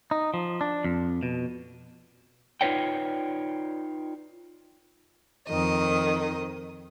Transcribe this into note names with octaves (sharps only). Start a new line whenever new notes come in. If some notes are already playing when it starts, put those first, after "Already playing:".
D#4
F3
D4
F2
B2
D#4 F4 B4 C#5 D5 G5
F2 D#3 D#5